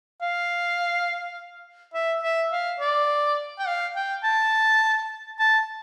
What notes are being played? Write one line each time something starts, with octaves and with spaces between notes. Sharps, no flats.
F5
E5
E5
F5
D5
G5
F5
G5
A5
A5